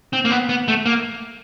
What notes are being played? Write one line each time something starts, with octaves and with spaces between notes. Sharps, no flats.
C4
A#3
B3
B3
A3
A#3